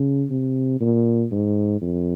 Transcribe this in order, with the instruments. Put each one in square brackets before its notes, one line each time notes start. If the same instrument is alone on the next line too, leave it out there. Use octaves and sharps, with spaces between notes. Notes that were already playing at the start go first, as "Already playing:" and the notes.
Already playing: [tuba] C#3
C3
A#2
G#2
F2